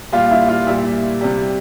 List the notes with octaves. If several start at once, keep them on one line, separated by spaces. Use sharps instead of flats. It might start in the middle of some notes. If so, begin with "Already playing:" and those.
A#2 G3 F4 F5
E4 E5
F4 F5
A#2 G3 E4 E5
C3 G3